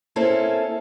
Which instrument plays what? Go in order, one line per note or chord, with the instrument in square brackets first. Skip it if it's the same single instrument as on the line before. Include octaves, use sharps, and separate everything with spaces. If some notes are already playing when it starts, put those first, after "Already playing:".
[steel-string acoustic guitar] A#3 C4 C#4 E4 A4